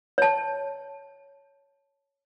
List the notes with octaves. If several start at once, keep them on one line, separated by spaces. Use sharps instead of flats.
C#5 A5